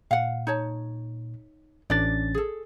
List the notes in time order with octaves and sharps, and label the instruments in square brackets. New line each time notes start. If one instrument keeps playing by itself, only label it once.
[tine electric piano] A#2 [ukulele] F5 F#5
[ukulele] D#4 C#5 A5
[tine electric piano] A1 C#4 A6 [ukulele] D4 D5
[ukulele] G#4 A4